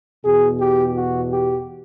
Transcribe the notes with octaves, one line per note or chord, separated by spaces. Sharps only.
E2 B2 G#4
G4
F#4
G4